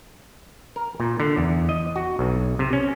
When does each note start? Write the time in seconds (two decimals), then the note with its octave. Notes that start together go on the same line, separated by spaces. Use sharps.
0.76 A#4
1.00 A#2
1.20 D3
1.37 E2
1.69 D#5
1.96 F#4
2.19 B1
2.59 C3
2.73 C#4